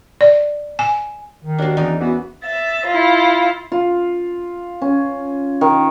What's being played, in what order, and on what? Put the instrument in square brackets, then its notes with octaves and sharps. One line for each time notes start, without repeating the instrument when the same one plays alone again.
[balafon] D5
G#5
[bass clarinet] D#3
[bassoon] D#2 [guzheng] A#3 D4 [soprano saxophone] F#4
[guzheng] E2 C#4 D5 [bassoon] D#4
[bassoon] E3 [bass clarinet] B3 [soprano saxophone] F#4
[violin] E5 A6
E4 F4
[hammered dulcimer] F4
C#4
D#3